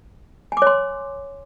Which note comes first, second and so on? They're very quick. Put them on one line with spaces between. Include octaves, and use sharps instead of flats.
G#5 D6 C#5 C6